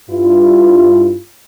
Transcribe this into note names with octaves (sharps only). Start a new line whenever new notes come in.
G2 E4 F4